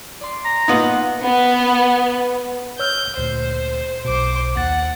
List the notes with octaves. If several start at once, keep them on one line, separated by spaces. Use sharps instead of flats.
D5 C6
A#5
A#2 B3 D#4 B4 F5 F#5
B3
C#5 E6 F6 G6
D2 A#2 C5
B1 B2 C5 D6
D#2 F#5 A6